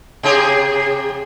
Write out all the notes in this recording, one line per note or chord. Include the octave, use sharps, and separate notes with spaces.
C3 G4 G#4